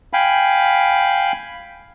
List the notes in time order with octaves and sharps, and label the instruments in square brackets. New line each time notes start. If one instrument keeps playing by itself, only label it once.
[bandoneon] F5 G5 G#5 B5